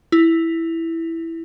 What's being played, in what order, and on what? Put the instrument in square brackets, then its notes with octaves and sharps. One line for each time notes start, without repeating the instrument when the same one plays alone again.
[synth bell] E4